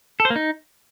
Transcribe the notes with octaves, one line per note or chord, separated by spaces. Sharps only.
A4
C5
A#3
D#4